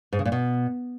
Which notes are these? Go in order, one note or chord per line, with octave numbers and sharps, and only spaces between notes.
G#2
C#3
A#2
B2